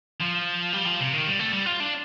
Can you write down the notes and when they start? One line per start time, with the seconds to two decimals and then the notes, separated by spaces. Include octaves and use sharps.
0.21 F3
0.74 G3
0.87 F3
1.01 C3
1.14 D#3
1.27 G3
1.39 A3
1.53 G3
1.66 F4
1.80 D4